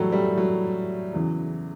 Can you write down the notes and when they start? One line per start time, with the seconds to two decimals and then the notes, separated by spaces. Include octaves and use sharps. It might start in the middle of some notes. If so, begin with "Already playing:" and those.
Already playing: A2 E3 F#3 G3 A3
0.12 G3
0.38 F#3
1.13 E2 C#3 E3